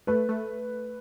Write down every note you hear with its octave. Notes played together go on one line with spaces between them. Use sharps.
A3 B4
A3